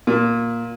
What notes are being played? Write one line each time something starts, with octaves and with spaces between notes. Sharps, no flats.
A#2